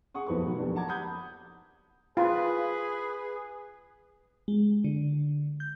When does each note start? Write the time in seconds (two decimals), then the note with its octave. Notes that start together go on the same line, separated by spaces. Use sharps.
0.14 G#4 F#5 C#6 D#6
0.26 F1 B1 F2 B4 C5 C#6
0.45 B2 D#3 F#3 F#4 A#4
0.58 D#1 F2 B3 D4 A#4
0.76 F#5 A5 A#5 D6 G#6
0.88 F#5 B5 D#6 G6 G#6
2.17 F4 G#4 B4
4.48 G#3
4.84 D3
5.60 G6